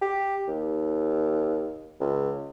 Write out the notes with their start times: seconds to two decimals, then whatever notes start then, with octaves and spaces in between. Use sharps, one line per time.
0.02 G4
0.48 D#2
2.00 C#2